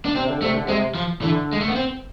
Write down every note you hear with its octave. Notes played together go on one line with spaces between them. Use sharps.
D4
C3 C4
D3
C3 A3
D3
C3 G#3
F3
D3 E3
G#3
A3
B3
C4